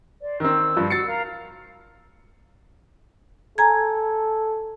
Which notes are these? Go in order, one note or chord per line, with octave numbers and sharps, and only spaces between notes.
C5 D5
D#3 C4 E6
G2 F3
F#4 F#5 E6 A6 C7 C#7
A#4 F5 A#5
A4 G#5 A#5 G#6